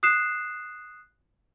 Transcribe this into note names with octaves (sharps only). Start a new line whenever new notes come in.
D#6 F#6 C7 E7